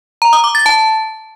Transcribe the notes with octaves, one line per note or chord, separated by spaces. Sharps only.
A#5
D#6
D6
A6
A5